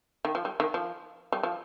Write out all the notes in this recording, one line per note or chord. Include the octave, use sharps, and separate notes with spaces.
D#3
F3
G3
D#3
F3
G3
F3